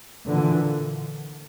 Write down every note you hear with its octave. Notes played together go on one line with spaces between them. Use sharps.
A#2 D3 E3